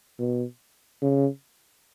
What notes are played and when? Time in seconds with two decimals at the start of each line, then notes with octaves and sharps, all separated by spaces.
0.19 B2
1.02 C#3